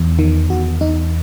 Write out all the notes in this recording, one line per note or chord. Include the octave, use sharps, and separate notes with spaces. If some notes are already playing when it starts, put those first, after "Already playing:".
Already playing: E2
D#3
E2 F#4
E2 D#4